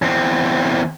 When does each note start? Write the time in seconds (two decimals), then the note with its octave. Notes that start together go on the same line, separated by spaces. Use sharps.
0.02 E2 C4